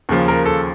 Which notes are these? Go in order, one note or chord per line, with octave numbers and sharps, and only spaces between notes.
D#2 C#3 F3
A#4
A4